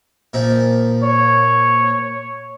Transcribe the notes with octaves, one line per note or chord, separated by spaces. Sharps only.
A#2 F3 D#4
C#5